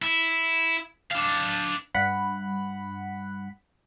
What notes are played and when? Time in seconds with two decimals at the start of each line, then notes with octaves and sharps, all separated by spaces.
0.02 E4
1.11 D4 F5
1.94 G2 F#5 B5